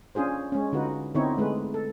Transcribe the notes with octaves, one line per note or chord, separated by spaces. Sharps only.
C#4 D4 F4 G#4 C5
G#3 C#4
D3 D#4 F4 F#4 B4
D3 B3 C4 D#4 E4 C#5
G#3 A3 B4
A4